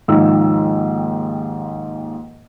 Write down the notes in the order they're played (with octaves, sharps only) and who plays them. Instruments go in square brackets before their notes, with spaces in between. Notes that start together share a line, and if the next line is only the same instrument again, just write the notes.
[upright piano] D#2 G#2 D#3 F3 D#4 E6